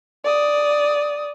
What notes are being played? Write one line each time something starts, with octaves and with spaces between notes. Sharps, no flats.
D5 D#6